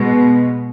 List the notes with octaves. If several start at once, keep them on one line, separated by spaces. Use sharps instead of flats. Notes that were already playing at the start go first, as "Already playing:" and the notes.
Already playing: B2 G#3